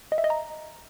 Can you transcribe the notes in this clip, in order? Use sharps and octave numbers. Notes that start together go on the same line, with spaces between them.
D#5
E5
D#5
A#5